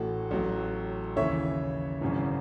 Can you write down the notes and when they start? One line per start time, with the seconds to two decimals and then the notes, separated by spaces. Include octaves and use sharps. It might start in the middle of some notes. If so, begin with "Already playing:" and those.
Already playing: A1 A2 E3 F#4 A4
0.31 A1 A2 F#3
1.16 D#2 C#3 E3 C#5 E5
2.01 G#1 F#2 C#3 E3